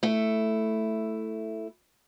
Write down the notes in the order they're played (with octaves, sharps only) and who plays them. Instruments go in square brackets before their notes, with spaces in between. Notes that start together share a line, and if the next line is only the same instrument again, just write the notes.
[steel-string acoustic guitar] A3 E4